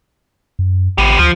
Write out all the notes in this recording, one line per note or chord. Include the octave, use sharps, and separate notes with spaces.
F#2
A1 B3 G4
D2 F3